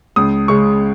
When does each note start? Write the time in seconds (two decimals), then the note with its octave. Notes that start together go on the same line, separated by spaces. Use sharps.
0.16 C#2 D#6
0.48 C#3 G#3 C#6